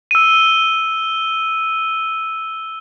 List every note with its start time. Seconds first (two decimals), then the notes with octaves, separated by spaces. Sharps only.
0.11 E6 D#7